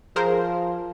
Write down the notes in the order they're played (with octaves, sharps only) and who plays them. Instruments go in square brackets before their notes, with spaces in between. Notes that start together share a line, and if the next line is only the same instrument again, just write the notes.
[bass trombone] F3 [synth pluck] G#4 A#4 C5